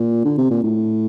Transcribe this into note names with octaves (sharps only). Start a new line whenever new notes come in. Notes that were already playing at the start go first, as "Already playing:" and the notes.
Already playing: A#2
D3
C3
A#2
A2